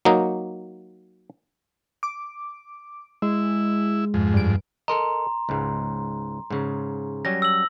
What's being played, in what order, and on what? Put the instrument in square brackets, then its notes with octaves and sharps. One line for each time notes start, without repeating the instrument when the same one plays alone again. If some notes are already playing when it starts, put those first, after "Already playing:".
[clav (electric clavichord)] F#3 A#3 D#4
[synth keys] D6
[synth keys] G#3 [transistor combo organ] E4
[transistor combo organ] F2 G#2
[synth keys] G2 D7
[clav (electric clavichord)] A4 A#4 D#5 [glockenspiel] A#5 C6
[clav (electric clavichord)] C#2 G#2
G#2 C#3
[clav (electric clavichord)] F#3 G3 C#4 [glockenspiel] A#6
[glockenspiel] E6 F#7